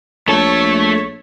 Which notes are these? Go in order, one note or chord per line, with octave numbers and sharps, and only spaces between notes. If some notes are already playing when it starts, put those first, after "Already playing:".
A#1 A3 A4 C#5 A5